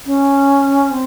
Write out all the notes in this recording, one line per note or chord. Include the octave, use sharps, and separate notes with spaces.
C#4
C4